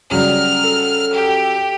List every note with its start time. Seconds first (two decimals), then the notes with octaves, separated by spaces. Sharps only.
0.11 C#3 F#3 G3 F6
0.64 A4
1.13 G4